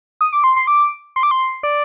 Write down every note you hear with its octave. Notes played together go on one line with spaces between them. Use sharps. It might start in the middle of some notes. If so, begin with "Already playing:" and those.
D#6
D6
C6
C6
D6
C6
D6
C6
D5